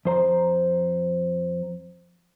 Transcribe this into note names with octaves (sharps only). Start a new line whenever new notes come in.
F2 C5 A#5